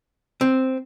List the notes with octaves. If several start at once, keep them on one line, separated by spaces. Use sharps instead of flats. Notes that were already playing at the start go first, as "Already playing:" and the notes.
C4